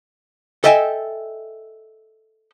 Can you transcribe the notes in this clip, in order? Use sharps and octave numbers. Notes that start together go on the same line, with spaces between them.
A4 D#5 E5 G5 G#5